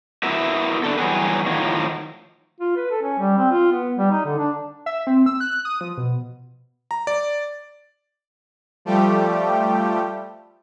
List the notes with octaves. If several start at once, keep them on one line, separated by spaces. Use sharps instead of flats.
B3 E4 F#4 A#4 E5
B3 C4 D4 A4
E3 F#3 G3 B3 G#4 B4
A2 D#3 F3 F#3
F4
B4
A4
C#4
G3
C4
F4
B3
G3
D#4
D3
D4
E5
C4
E6
F#6
D#6
F3
B2
A#5
D5
F3 G3 A3 G4